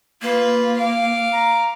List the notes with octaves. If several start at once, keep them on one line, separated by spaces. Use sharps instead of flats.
A#3 F4 B4
F5 D6
A#5